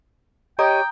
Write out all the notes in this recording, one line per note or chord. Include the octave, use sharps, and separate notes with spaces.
G4 C#5 D#5 G5 A#5 D#6